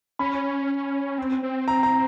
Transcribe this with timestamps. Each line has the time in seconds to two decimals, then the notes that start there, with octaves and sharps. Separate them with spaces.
0.19 C#4 B5
1.18 C4
1.43 C4
1.68 A#5
1.83 A#5